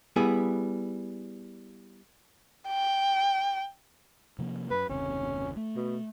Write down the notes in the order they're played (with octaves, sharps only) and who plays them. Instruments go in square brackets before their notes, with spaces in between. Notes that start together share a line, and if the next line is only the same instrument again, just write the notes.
[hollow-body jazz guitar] G3 B3 E4 G#4
[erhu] G5
[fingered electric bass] C3 F3 A#3
[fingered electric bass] F#2 [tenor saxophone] B4
[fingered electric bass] F#1 D#2 C3 [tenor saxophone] C#4
[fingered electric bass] A3
[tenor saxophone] B2